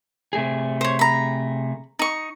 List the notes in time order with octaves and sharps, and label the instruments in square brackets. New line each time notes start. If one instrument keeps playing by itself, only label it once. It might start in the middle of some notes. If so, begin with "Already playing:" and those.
[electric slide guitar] C3 A3 G#4
[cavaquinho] C5 C#5
A#5 B5
D#4 C#6